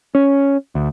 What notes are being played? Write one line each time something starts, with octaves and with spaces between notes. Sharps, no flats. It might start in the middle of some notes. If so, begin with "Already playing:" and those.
C#4
D2